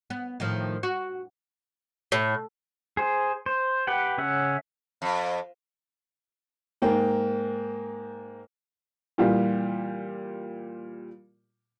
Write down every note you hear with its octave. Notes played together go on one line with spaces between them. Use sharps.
B3
A2 D#3 F3
F#4
A2
G#4 C5
C5
G4 B4 F#5 G5
C#3 C#4 E5 F#5
F2
G#2 A#3 G5
A#2 E3 G3 F4 G4